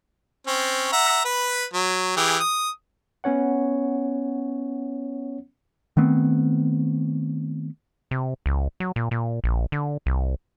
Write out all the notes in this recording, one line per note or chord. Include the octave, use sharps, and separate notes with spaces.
C4 C#4
E5 F#5 A#5
B4 B5
F#3
E3 G4 G#4
D#6
B3 C#4 C#5 F#5
D#3 A3 B3 C4
C3
C#2
F#3
A#2
A#2
A#1
D3
C2